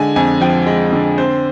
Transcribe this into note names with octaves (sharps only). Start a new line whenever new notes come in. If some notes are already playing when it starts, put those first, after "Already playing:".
Already playing: D3 G#3 G#5
F2 G#5
F3 G5
G#3
D3
C4 C5